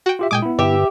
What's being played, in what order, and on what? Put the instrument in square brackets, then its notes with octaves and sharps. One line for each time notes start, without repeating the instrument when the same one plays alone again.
[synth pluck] F#4 G5
[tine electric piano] F4 G4 E5
[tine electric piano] A#2 G#3 D#6 [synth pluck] G5 G#5 D6
[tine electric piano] B3 E4
[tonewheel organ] G2 D3 B4 [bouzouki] G4 E5